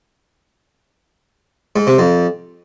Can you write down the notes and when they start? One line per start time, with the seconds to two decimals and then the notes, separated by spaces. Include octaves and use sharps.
1.76 G#2
1.87 C3
1.98 F2